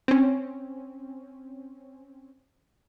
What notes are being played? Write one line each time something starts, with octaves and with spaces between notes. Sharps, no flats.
C4 C#4